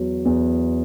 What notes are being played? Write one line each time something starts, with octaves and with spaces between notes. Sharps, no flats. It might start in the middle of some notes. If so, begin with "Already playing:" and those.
Already playing: E2 F#3
E2